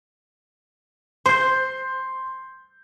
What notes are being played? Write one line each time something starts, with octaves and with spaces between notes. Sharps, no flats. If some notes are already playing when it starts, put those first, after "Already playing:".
C5 C6 G6